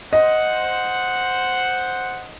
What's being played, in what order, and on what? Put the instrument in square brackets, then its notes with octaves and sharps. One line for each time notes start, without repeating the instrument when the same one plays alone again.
[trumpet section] C5 F#5 [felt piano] D#5